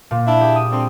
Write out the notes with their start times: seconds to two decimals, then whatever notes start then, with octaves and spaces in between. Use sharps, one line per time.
0.11 A#2
0.25 D4 E4
0.40 G4 G#4
0.56 D#6
0.69 D3 G3 C4